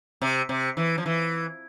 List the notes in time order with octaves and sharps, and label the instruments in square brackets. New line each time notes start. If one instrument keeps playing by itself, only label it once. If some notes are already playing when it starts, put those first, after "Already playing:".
[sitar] C3
C3
E3
F3
E3